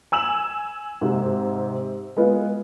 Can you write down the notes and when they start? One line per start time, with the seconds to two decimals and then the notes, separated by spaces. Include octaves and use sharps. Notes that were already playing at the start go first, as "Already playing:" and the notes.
0.12 G#5 E6 E7 F#7
1.01 G#2 C3
2.17 G#3 B3 F4